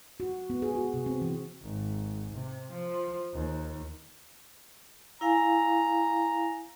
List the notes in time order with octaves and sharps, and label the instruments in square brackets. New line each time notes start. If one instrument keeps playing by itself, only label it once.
[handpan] F#4
B3
G#4
F#4
C3
C4
E3
[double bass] G#1
C3
F3
D#2
[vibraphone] E4 F5 G#5 [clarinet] A#5